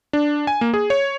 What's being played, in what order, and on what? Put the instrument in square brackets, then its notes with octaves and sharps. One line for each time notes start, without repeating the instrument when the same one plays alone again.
[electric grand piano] D4
G#5
A#3
G#4
C#5